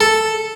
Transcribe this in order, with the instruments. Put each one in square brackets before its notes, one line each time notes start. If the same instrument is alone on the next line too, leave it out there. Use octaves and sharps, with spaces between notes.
[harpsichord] A4